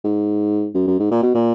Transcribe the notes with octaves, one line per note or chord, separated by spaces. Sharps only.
G#2
F#2
F#2
G#2
A#2
B2
A#2